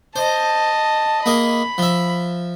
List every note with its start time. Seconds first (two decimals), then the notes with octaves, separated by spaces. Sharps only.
0.16 C5 D#5 A5
1.26 A#3 G#4 D#5 B5
1.78 F3 E5